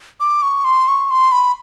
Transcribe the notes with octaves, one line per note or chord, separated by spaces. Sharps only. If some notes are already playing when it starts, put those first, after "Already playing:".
D6
C#6
C6
C#6
C6
B5